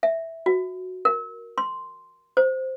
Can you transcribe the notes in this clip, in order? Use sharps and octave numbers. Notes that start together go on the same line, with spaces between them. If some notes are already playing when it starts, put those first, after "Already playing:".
E5
F#4
A#4
C6
C5